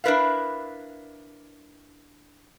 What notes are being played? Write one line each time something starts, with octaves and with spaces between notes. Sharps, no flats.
D4 E4 A#4 B4 E5 F5